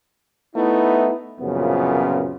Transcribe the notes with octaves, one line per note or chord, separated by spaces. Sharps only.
A3 B3 D#4 E4
C2 F#2 A#2 C#3 F3 B3